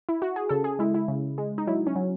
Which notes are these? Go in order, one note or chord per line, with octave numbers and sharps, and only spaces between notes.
E4
F#4
G#4
C#3 A4
G#4
G#3 E4
E4
C#3
G#3
D#4
F#3 E4
C#4
F#3